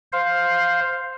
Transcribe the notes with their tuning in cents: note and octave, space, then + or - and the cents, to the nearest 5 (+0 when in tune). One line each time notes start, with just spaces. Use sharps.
C5 +0 F5 +5